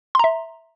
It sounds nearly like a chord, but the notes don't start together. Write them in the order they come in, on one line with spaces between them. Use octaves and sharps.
C6 A#5 E5